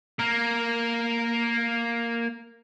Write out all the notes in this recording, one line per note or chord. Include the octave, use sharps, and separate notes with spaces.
A#3 A#4